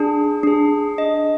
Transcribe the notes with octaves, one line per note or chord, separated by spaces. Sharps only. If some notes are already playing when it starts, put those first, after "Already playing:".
Already playing: D4 G#4
D4 G#4
D4 G#4 D#5